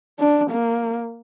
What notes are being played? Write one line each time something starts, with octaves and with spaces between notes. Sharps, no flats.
D4
A#3